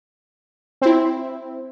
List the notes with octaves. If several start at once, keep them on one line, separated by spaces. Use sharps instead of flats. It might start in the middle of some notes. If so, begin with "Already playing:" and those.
C4 E4